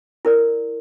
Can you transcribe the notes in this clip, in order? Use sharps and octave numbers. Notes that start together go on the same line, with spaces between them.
E4 A#4 D5